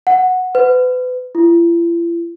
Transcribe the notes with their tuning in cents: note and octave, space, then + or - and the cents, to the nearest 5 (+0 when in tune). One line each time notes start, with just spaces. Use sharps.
F#5 -5
B4 +35
E4 +45